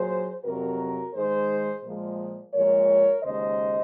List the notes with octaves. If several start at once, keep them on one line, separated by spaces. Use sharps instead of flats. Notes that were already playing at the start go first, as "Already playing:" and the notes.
Already playing: A#2 F#3 G#4 C5
F2 C3 F#3 F#4 A#4
G#2 D#3 G#3 G#4 C5
A#2 F3 G#3
A#2 F3 G#3 A#4 C#5
D#2 C#3 G#3 C5 D#5